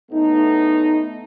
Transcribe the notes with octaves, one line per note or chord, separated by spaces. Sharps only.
A2 A3 B3 D#4